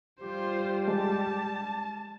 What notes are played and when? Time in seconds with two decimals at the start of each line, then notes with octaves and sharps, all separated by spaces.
0.20 G3 F4 G4 C5
0.88 G#3 A5